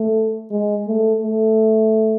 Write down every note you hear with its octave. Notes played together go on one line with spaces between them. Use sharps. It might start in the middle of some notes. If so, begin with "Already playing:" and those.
Already playing: A3
G#3
A3
A3